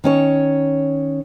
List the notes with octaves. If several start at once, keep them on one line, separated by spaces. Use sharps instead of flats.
D#3 C#4 C#5